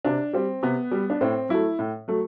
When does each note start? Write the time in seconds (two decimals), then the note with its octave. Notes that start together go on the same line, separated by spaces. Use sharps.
0.05 C3 D4
0.33 G3 C4
0.63 C3 B3
0.91 G3
1.10 D4
1.21 A2 C4
1.49 F#3 A3 E4
1.79 A2
2.08 F#3 A3